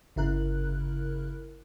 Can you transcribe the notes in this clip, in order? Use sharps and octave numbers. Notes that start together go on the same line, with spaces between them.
G1 C#3 E4 A#4 F#6